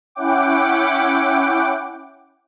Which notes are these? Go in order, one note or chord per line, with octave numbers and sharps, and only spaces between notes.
C#4 E4 F#5 G5 D6